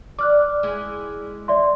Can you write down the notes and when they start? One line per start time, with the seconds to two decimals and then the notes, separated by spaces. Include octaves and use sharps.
0.19 D5 D6 F6 F#6
0.63 G#3 E4
1.48 D5 E5 C6